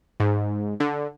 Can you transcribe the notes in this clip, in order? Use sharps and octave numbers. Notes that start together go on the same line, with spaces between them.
G#2
D3